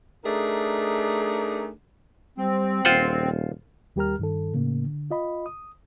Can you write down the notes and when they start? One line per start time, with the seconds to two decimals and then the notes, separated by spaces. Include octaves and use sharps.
0.24 A3 D4 D#4 G#4 A#4
2.38 G3 C4
2.85 D#1 F4 C5 F#5
3.96 D#2 G3 G4 A#4 A#5 F6
4.19 G2 D#3 A4
4.54 A2 C#3 A#3
4.86 D3
5.11 F4 D#5 B5
5.46 D#6